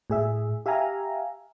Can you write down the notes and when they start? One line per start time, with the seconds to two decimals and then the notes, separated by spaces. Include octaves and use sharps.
0.10 A2 G#4 E5
0.66 G4 E5 F5 G#5 A#5